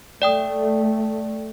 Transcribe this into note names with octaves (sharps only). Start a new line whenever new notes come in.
A3 D5 G5 D#6